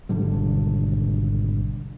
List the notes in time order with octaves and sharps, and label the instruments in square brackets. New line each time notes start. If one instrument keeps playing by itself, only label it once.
[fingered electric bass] G#1 B2 D3 G3